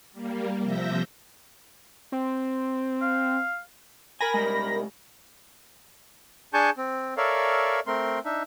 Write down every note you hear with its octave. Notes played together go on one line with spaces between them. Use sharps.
G3 A#3
C3 F3 E5 G6 A#6
C4
F5
A#4 G#5 B5 A#6
C2 G3 G#3
D4 G#4 G#5 A5 C#6 G6
C4
A4 A#4 C#5 D5 E5 F5
A3 C4 A#4 C6
D4 D#4 E5